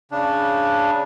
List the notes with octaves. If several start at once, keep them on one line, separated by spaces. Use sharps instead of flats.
C#3 D4